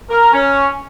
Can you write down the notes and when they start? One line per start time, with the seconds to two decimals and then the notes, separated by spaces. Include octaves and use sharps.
0.10 A#4
0.34 C#4